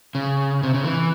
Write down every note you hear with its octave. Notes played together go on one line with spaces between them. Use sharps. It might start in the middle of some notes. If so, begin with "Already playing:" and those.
C#3
C3
C#3
E3